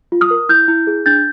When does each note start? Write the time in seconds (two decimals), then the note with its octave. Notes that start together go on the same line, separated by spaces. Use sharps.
0.12 F4
0.21 D#6 F6
0.31 A#4
0.49 E4 F6 G6
0.68 E4
0.87 G#4
1.06 D4 G6 A6